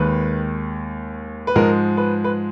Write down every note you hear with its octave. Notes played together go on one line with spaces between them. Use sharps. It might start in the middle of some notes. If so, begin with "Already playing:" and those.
Already playing: D#2 D#3 G#3 B4
B4
G#2 F3 G#3 A#4
B4
B4